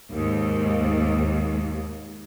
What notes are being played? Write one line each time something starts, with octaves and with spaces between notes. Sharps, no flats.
D#2 G#2